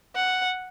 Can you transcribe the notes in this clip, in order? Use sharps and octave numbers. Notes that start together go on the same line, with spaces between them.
F#5